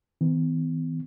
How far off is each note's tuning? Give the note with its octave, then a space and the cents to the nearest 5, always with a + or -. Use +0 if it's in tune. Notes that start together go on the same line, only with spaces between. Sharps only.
E3 -45 B3 +45